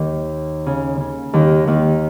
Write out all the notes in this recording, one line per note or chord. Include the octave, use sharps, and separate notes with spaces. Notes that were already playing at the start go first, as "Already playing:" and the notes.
Already playing: D#2 D#3
C#3
C#3
D#2 D#3
D#2 D#3